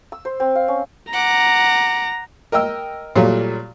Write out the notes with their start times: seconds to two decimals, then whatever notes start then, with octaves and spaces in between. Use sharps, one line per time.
0.12 E6
0.25 C5
0.40 C4
0.55 F5
0.68 C#4
1.13 F#5 A#5 D6
2.52 A#4 D#5 G5 E6
3.16 A#2 F#3 G3 A3 F4